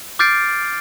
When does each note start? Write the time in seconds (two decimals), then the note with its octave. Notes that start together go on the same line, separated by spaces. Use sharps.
0.19 D6 F6 G6 A6 C7 D7